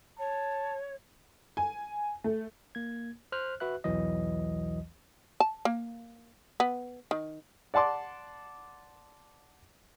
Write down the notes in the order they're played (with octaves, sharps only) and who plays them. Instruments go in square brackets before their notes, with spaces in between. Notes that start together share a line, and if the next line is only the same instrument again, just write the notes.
[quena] C#5 [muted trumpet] A5
[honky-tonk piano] G#5
A3
[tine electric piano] A#3 G#6
C5 F6 F#6
F#4 B4 E5 F#6
B1 E2 E3 F#3 D#5
[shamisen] A5
A#3
B3
D#3
[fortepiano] D5 F#5 A5 C6 D6